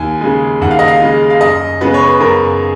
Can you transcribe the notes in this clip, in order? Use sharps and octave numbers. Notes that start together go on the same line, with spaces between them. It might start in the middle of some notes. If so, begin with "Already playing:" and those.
Already playing: D#2 G#5
C#3 G#3
D#2 F#5
F5
D#5
F5
C#3 G#3
F5
F#2 D#5
C#3 G#3 B3 B4
C#5
B4
F#2 A#4